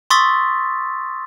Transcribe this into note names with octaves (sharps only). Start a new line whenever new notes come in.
C6 C#6 D#6 E6 A6 B6